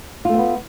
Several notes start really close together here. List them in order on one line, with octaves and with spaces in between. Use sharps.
F4 A3 C4 B3